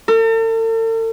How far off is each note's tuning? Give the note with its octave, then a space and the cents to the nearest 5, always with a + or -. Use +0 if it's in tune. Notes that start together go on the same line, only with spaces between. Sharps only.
A4 +45